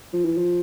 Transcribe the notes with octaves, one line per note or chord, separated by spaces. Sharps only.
F3
E3
F3